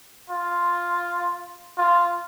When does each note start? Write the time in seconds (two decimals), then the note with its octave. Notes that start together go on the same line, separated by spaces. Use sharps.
0.30 F4
1.77 F4